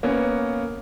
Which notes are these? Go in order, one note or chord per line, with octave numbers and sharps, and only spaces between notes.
A#3 B3 C#4